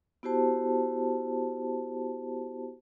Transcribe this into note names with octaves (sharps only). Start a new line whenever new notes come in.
B3 E4 F#4 G4 C5 A5